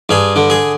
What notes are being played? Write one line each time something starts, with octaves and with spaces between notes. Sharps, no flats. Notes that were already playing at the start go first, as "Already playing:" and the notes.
G2 G#4
D3
G#4